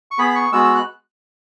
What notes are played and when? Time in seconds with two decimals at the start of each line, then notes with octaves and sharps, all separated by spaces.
0.11 C#6
0.18 B3 G#4 B5
0.30 B5
0.35 C#6
0.52 G#3 B3 F#4 E6
0.64 E6
0.75 F#6